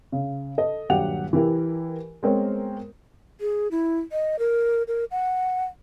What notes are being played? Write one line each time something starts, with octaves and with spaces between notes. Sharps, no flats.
C#3
A4 D#5
D#1 G2 F#3 G4 F#5 F7
E3 E4 G4 A#4
G#3 B3 C4 A#4 C5 C#5
G#4
E4
D#5
A#4
A#4
F#5